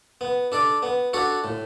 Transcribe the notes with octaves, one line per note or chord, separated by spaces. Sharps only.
B3
D4 A4 D5
B3
D4 F#4 A4 C#5
A2